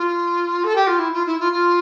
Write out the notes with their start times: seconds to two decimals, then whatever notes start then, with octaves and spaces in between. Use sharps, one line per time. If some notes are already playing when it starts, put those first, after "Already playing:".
Already playing: F4
0.63 A4
0.75 G4
0.86 F4
0.98 E4
1.13 F4
1.26 E4
1.39 F4
1.52 F4